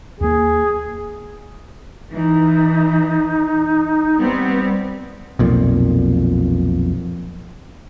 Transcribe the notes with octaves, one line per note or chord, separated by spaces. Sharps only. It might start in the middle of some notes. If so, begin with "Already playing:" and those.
D#2 A#3 G#4
E3 D#4
G3 B3 C4
B1 F2 A#2